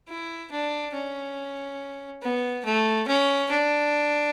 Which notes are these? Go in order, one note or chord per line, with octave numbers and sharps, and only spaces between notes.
E4
D4
C#4
B3
A3
C#4
D4